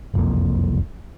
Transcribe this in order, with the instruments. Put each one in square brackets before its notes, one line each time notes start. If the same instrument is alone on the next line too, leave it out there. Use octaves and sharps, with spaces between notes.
[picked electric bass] F#1 C2 F2 A#3